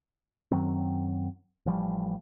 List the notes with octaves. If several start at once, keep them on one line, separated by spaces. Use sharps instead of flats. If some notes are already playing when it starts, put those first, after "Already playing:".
F#2 D#3 F#3 C4
A1 F3 G3